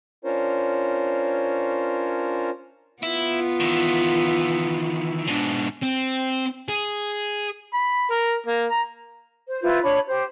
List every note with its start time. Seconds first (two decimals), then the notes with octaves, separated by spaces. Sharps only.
0.25 C#4 D4 F4 A#4 C5 C#5
3.03 B3 E4 F4
3.60 D#3 E3
5.27 G#2 B2 D4
5.83 C4
6.69 G#4
7.74 B5
8.11 A#4
8.47 A#3
8.71 A#5
9.47 C5
9.61 E4 F4 B4 C5
9.82 D4 C#5 B5
10.06 G4 C5